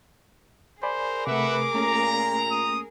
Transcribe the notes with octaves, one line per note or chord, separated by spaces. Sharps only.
G#4 A#4 C5 D5 G#5 B5
C3 A3 B4 E5 F#5 D6
A#2 A3 A#3 C#4 A#5
D#6